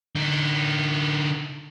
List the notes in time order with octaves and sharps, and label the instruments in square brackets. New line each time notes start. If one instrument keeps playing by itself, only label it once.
[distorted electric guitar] D3 D#4